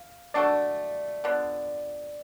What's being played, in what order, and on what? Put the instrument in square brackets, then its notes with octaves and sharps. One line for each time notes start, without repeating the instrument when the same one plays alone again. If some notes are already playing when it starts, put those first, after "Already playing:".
Already playing: [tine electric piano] F5
[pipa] A3 D4 F#4 A4 [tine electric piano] D5
[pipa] D3 F3 B3 [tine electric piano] D5